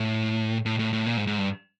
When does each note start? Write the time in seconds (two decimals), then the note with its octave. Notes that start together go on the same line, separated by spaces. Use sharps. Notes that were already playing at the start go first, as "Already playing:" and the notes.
Already playing: A2
0.66 A2
0.79 A2
0.93 A2
1.06 A#2
1.17 G#2
1.27 G#2
1.39 G2